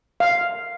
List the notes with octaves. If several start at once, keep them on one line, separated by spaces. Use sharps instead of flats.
F5